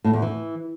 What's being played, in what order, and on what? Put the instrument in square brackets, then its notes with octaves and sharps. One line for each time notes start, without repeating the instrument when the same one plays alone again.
[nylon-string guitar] A2
E2
E3